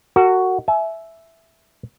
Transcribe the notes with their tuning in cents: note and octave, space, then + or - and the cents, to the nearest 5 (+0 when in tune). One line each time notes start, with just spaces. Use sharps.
F#4 +5 A#4 -45
E5 +0 G#5 +35